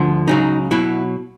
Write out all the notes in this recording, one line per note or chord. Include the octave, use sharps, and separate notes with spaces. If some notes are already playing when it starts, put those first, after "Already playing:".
Already playing: D2 D3 F3
C#2 C#3 F#3 D#4
B2 F#3 E4